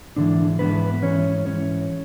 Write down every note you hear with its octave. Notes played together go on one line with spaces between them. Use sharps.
G#2 D3 E3 D4
G#2 E3 B3 B4
G#2 E3 C#4 C#5
G#2 E3 C#4 C#5